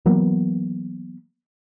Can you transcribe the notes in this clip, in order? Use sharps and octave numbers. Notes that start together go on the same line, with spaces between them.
E3 F#3 A#3 B3